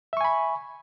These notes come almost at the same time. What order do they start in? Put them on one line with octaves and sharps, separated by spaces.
E5 C#6 G#5 B5